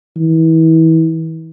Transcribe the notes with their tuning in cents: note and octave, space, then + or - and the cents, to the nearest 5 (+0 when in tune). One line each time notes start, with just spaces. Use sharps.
E3 -35